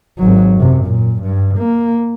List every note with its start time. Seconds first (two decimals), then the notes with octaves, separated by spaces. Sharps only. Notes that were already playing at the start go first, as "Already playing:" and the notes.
0.18 G#1 F#3
0.57 F#2 C3
0.86 A#2
1.23 G2
1.58 A#3